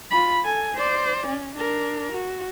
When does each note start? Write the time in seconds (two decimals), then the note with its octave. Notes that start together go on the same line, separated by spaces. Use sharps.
0.11 F4 B5
0.43 A4 G#5
0.75 C5 D5
1.27 C#4
1.56 D4 A#4
2.12 F#4